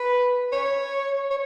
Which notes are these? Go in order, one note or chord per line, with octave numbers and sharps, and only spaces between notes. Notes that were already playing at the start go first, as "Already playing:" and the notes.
Already playing: B4
C#5
C#5